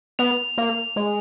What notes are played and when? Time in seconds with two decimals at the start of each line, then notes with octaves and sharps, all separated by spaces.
0.19 B3 F7
0.58 A#3
0.96 G#3